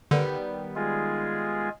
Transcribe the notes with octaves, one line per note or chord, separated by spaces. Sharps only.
D3 D#3 G3 B3
G#3 F4 G#4